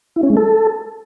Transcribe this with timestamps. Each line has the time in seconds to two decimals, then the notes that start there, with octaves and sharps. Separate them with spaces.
0.16 E4
0.23 C#4
0.30 G#3
0.37 A4